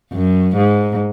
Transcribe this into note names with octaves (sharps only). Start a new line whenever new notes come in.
F#2
G#2